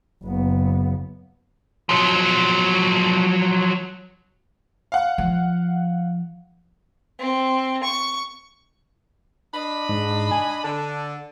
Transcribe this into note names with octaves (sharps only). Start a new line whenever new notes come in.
F#1 B3
F3 F#3
F5 F#5
F3
C4
C#6
D4 D#5 B5
G#2
G#5
D3 A5